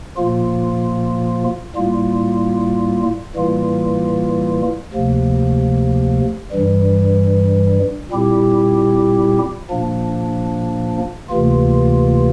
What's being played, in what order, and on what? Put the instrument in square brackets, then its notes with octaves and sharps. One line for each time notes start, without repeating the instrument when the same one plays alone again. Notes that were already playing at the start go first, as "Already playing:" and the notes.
[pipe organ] A#2 F3 A#3 F4
A2 G3 A#3 F4
A2 E3 G3 A#3 F4
D2 C3 F3 A#3
G2 E3 G3
A#2 G3 C4 E4 G4
A#2 F3 A#3 D4
D2 C3 E3 A#3 F4